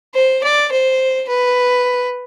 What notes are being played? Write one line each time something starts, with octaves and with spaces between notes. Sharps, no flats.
C5
D5
C5
B4